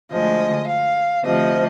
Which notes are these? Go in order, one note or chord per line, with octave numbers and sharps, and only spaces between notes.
D2 D3 F3 G#3 D#5
F5
D2 C3 F3 D#5